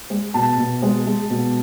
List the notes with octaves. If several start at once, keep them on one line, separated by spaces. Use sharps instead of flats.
G#3
B2 A5
B2
G#3
G#3
B2